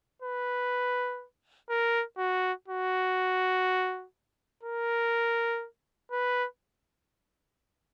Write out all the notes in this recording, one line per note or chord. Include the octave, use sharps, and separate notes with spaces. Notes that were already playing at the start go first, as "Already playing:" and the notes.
B4
A#4
F#4
F#4
A#4
B4